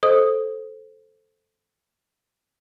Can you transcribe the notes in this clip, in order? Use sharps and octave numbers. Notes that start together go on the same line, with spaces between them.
A4 C5 D#5 D#6